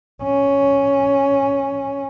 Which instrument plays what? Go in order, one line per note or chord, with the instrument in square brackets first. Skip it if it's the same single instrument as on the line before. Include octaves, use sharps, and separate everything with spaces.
[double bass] C#4